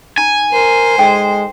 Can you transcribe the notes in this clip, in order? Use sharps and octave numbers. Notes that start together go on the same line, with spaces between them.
D#4 G#5 A#5
A#4 C5
G#3 D#4 A4 G5